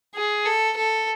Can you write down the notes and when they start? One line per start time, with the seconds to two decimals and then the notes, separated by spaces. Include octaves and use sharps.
0.16 G#4
0.46 A4
0.77 A4